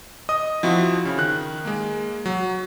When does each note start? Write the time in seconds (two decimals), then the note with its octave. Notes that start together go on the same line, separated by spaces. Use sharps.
0.29 D#5 D#6
0.63 F3 C4 E4 F#4
1.05 C#3
1.18 D#3 F#6
1.65 G#3 A#3
2.26 F#3